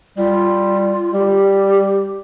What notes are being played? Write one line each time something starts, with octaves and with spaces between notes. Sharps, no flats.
G3 F4
G3 G4